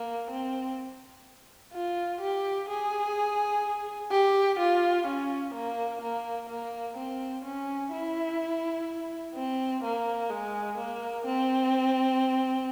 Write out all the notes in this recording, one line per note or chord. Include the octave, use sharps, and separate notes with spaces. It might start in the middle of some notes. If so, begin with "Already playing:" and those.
Already playing: A#3
C4
F4
G4
G#4
G4
F4
C#4
A#3
A#3
A#3
C4
C#4
E4
C4
A#3
G#3
A#3
C4